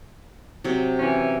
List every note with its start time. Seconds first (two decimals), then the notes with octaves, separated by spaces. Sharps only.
0.64 C3 F#3
0.99 E3 C#4